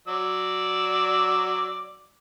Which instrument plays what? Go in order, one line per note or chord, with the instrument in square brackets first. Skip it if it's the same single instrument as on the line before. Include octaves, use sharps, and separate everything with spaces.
[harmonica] F#3 D5 E6